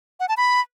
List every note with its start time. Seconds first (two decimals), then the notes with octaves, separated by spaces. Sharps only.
0.20 F#5
0.29 A5
0.37 B5